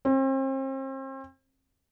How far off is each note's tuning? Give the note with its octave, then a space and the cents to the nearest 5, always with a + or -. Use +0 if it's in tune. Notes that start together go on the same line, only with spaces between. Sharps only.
C4 +40